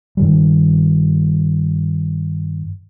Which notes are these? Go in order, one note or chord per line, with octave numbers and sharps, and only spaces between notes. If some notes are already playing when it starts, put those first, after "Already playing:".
G2 D#3 G3